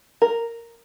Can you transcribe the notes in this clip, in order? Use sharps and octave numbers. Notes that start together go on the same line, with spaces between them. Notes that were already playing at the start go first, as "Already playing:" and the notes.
A#4